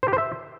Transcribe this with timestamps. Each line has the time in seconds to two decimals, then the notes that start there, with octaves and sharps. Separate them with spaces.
0.03 C5
0.08 G4
0.13 C5
0.18 E5